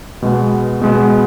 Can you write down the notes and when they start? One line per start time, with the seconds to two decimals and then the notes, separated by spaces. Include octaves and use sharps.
0.22 B2 G#3 B3
0.81 B2 G#3 B3